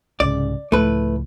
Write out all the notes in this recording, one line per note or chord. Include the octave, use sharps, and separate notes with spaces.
C2 G#2 C#3 D5
C#2 A2 F3 A3 B4